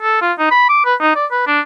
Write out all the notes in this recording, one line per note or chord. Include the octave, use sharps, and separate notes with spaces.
A4
F4
D#4
B5
D6
B4
D#4
D5
B4
D4